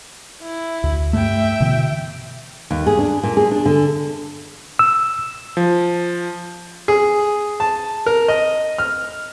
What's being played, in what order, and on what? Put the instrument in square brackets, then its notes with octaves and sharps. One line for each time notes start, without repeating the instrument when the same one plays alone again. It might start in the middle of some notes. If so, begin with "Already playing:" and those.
[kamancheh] E4
[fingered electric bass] D2
[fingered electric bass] G2 A3 [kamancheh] E5 G5
[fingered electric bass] B2 D3 E3
[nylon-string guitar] D#2
G#4
D4
A#2
G#4
D4
D3
[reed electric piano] E6
[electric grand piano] F3
[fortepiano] G#4
A5
A#4
D#5
F6